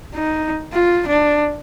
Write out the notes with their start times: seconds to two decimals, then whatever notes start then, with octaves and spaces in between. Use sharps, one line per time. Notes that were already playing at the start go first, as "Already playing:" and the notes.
0.14 D#4
0.73 F4
1.07 D4